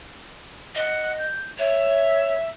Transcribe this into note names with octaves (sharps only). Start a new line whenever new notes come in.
D#5 F#5
G6
C#5 E5